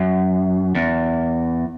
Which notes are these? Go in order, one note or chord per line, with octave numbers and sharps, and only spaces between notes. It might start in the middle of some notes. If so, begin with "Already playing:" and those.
Already playing: F#2
E2